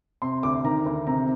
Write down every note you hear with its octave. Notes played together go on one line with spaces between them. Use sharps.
C3 C6
D2 D6
D#3 A#5
D2
C3 A#5